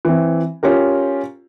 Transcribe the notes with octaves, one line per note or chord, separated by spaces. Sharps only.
E3 C4
C#4 F4 G4 A#4